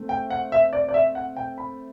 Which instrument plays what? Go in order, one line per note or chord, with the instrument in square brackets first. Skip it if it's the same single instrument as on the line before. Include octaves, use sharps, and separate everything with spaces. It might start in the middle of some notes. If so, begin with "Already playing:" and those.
Already playing: [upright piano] A3 C4
[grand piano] G5
F#5
E5
D5
D5
E5
F#5
G5
B5